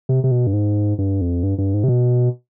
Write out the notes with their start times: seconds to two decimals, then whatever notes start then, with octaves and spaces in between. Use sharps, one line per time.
0.09 C3
0.24 C3
0.31 B2
0.47 G2
0.53 G#2
0.98 G2
1.21 F2
1.43 G2
1.58 G2
1.74 G#2
1.84 C3
1.88 B2